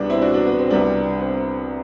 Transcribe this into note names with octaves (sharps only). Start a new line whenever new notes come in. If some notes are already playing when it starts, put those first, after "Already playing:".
Already playing: C2 B2 G3 B3 D4
C4 E4
D4 F#4
B3 D4
B3
C4
C2 C3 G3 B3 D4
C4